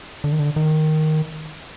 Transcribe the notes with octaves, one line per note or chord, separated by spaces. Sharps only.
D3
D#3
D3
D#3